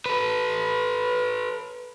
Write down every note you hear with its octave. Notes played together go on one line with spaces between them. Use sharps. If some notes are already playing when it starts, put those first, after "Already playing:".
A4 B4